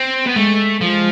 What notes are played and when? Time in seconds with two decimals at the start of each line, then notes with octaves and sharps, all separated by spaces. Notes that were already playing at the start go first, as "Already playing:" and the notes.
Already playing: C4
0.27 B3
0.36 G#3 A3
0.81 F3 G#3